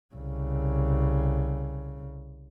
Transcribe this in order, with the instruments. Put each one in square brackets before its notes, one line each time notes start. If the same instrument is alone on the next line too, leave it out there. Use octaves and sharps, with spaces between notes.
[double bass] C2 C#3